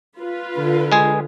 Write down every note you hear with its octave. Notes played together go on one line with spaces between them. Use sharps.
F4 B4
D3
G#3 G#4